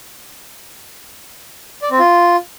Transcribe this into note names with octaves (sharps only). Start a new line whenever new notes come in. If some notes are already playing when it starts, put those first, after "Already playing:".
D5
C4
F4